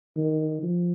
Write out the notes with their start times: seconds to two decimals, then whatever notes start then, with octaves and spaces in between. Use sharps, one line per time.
0.17 D#3
0.63 F3